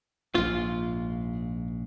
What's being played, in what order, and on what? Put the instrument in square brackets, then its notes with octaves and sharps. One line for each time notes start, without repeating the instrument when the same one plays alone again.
[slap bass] A#1 G#2 [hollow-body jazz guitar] F4